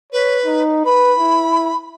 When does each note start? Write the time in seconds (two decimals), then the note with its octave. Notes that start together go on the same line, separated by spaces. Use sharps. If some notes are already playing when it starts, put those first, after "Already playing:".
0.12 B4 C#5
0.45 D#4
0.86 B4 B5
1.18 E4